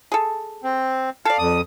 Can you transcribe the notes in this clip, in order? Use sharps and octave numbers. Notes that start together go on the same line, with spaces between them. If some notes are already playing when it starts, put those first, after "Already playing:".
G#4 A4
C4
A4 D5 F5
F2 D#6